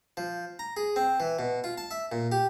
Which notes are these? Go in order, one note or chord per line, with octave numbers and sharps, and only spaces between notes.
F3
A#5
G#4
C4
E3
B2
F4
A5
E5
A#2
G4